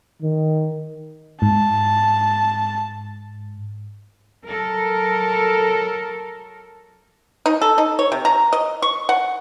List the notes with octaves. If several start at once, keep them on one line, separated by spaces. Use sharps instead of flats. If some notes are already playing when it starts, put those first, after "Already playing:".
D#3
G#2 A5
F#3 A4 A#4
D#4
A4
D#4
C#5
C3
A#5
D#5
C#6
F#5